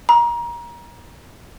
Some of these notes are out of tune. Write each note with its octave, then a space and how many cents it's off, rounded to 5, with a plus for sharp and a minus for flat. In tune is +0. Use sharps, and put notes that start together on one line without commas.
A#5 +25